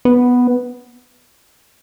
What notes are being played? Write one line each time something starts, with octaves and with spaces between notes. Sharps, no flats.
B3